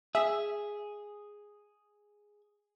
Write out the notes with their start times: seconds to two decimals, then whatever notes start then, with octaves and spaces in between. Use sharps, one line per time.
0.15 G#4 E5